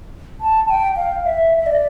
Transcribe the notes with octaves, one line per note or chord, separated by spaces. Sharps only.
A5
G5
F5
E5
E5
D5